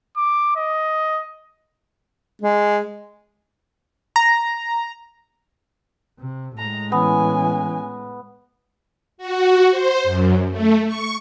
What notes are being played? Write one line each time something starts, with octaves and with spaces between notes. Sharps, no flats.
D6
D#5
G#3
A#5
C3
A2 G#3 A#5
E3 B3 C#4 G#5
F#4
C5
F#2
A3
C#6